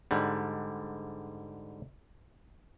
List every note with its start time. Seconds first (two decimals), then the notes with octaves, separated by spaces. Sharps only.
0.11 G#2 D3 G3